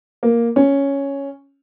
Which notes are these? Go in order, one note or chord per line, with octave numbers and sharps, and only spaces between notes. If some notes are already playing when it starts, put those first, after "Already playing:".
A#3
C#4